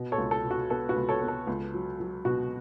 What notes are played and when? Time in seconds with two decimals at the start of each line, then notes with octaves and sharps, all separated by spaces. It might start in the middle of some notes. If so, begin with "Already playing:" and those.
Already playing: B2
0.12 A4 C#5
0.18 C#2
0.31 A4
0.45 B2
0.51 F#4
0.70 B3 A4
0.89 F#4 B4
0.96 C#2
1.09 A4 C#5
1.22 B3
1.28 A4
1.47 C#2
1.74 F#3
2.00 F#3
2.25 B2 F#4